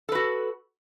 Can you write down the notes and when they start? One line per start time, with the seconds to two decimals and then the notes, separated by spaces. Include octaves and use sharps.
0.09 A4
0.12 B4
0.15 F#4